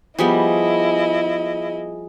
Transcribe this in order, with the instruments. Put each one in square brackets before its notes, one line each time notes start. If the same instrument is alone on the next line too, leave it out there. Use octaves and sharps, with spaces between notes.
[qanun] F3 G3 B3 [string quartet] E4 D#5 [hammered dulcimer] G#4